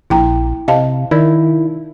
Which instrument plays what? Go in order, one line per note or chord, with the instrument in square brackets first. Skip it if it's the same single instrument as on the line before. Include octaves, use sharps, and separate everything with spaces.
[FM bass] A#1 [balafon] E4 G5 A#5
[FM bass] C3 [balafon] D#5 F5 A5
[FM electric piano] D#3 [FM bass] E4 [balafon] D5